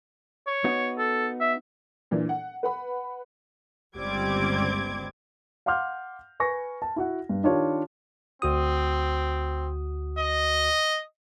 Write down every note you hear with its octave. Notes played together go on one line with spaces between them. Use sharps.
C#5
B3 D#4 F#4
A4
E5
A#2 E3 D4
F#5
B4 F#5 B5
G1 C#2 G3 C4 D6 G#6
F5 F#5 C6 D6 F6 G6
B4 G#5 C#6 A#6
A5
E4 F#4 F#5
G2
D#3 D4 F4 G4 C#5
D2 C4 F#4 D#6
D#5